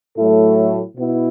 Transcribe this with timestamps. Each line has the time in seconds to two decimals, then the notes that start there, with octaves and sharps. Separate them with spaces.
0.17 A2 F#3 A3 E4 A4
0.98 B2 B3 E4